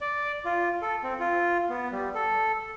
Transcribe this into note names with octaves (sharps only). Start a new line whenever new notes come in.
D5
F4
A4
C4
F4
B3
G3
A4